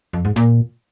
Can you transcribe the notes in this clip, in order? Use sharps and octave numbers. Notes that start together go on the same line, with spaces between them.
F2
G#2
A#2